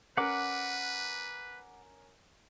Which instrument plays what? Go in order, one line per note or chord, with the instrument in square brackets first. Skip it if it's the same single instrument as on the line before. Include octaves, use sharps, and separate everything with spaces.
[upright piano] C#4 A#4 [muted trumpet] B4 [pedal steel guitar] F#5 D6